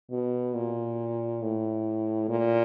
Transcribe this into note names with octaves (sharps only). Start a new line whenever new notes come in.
B2
A#2
A2
A#2